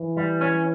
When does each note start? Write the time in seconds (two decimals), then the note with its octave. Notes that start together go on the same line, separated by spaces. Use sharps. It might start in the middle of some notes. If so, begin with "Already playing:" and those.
Already playing: E3
0.17 G3
0.41 C#4